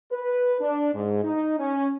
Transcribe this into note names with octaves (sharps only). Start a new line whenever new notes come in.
B4
D4
G#2
D#4
C#4